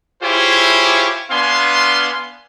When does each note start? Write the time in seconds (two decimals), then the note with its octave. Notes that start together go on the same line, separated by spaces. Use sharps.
0.22 E4 F4 G4 G#4 C5 C#5
1.31 B3 D4 F5 G#5 C6